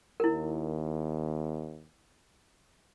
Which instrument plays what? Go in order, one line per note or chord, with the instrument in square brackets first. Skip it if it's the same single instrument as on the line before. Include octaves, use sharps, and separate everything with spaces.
[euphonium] D#2 [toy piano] E4 A#4